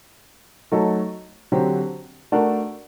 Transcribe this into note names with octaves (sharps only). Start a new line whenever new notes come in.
F#3 A3 D#4 A4
D3 F#3 C4 G4
A3 D4 F#4 A#4